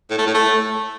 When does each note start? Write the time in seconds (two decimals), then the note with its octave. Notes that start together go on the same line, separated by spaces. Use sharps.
0.10 A2
0.18 A3
0.26 A2
0.34 A3